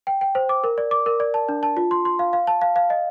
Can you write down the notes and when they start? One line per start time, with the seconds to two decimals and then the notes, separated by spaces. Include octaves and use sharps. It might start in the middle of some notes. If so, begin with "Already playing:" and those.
0.07 G5
0.21 G5
0.35 C5
0.49 D6
0.64 A#4
0.78 D5
0.91 D6
1.06 A#4
1.20 D5
1.34 A5
1.49 D4
1.63 A5
1.77 F4
1.91 C6
2.05 C6
2.19 F5
2.33 F5
2.47 A5
2.61 F5
2.76 F5
2.90 D#5